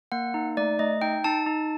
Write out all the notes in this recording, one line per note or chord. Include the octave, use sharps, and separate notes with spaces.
A#3 F#5
D#4
A3 D5
A3 D#5
D#4 G5
D#4 A5
D#4